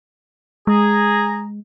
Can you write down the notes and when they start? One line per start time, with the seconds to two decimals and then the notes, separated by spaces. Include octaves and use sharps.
0.67 G#3 G#4 A#5